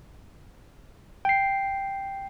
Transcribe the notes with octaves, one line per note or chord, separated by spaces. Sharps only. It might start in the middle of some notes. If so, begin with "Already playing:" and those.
G5 C7